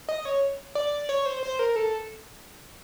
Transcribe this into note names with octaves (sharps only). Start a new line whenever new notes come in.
D#5
C#5
D5
C#5
C5
C5
A#4
A4